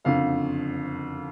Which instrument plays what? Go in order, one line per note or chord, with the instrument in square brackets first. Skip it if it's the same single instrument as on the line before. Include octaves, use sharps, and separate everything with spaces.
[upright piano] F#1 F2 D3 F3 F5